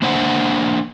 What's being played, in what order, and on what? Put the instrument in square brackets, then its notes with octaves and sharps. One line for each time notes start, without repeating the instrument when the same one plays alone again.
[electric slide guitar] A#3 D4 C5 E5 F#5 G#5